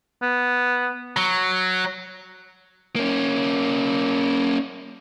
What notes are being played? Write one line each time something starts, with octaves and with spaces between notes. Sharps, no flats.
B3
F#3
A#3 C#4